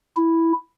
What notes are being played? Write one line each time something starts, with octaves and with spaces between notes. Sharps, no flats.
E4